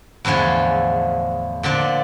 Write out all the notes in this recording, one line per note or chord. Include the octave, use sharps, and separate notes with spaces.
E2 A2 D3 F3 G#4
A#2 D3 F3 D5